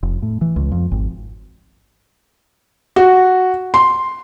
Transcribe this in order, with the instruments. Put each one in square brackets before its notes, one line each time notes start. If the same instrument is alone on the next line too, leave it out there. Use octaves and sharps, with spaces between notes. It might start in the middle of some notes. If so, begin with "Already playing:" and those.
[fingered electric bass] F1
A2
E3
C#2
F2
G#1
[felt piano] F#4
C6